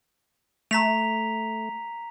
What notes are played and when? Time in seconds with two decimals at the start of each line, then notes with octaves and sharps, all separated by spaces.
0.71 A3 A#5 B6 F7